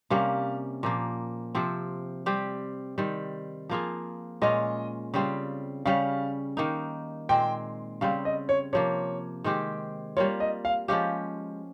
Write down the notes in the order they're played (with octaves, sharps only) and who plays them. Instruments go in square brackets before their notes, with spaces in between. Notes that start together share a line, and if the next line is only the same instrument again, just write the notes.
[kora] C3 G3 A#3 C#4 [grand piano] F5
[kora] A#2 F3 A#3
C3 F3 C4
G3 C4 G4
D#3 G3 C4
F3 A#3 F4 G#4
[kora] A#2 G#3 C#4 F4 [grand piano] D#5
[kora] C#3 G3 C4 F4
[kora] C#3 G3 C#4 [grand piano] F5
[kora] D#3 A#3 D#4
[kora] A#2 G#3 C4 [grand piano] G5
[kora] C#3 G3 C4 [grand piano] F5
[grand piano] D#5
C#5
[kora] C3 F3 A#3 [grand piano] C#5
[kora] D#3 G#3 C4 G4
[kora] G3 A#3 F4 [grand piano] C#5
[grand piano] D#5
F5
[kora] F3 G#3 C#4 G4 [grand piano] F5